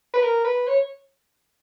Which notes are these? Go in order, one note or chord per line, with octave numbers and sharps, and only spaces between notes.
B4
A#4
B4
C#5